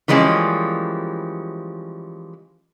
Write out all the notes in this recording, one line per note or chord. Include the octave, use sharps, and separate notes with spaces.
E3 F3 G3 G#3 A#3 C#4